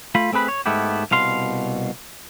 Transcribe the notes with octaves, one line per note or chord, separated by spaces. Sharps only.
A3 F4 B5
A3 C4 G#4 B4 B5
C#5
G#2 A3 B3 E4 G4
C2 B2 F5 C6